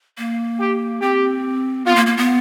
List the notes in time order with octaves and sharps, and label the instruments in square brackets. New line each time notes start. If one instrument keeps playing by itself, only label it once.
[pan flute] A#3
[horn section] G4
[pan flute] C4 [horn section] G4
[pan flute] B3 [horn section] F4
[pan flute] A#3
A#3
B3